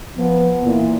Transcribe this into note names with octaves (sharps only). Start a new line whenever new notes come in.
F3 B3
A#2 E3